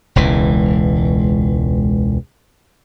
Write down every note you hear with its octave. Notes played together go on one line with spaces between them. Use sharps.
E1 C#2 E3